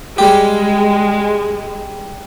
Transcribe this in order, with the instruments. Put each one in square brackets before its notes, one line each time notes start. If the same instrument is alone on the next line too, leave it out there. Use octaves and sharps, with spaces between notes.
[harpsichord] G3 G4 [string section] G#3